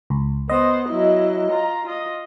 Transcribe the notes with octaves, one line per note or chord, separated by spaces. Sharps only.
C#2
B3 C5 D#5
F#3 E4
F4 A#5
F4 D#5